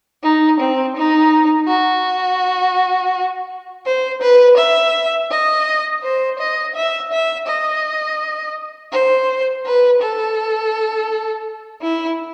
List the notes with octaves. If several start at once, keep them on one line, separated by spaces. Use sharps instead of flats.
D#4
C4
D#4
F#4
C5
B4
E5
D#5
C5
D#5
E5
E5
D#5
C5
B4
A4
E4